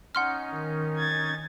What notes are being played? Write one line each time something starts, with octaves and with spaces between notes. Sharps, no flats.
C#4 D#4 F#5 C6 F6
D#3
G#6 A6